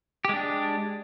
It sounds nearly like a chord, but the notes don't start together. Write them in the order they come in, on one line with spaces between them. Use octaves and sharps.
G4 G#3 D4